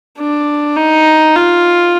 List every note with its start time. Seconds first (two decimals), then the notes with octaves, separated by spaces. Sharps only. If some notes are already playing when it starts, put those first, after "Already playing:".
0.19 D4
0.76 D#4
1.36 F4